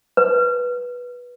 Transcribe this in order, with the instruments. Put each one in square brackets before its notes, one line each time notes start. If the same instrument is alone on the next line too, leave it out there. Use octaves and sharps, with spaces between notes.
[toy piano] B4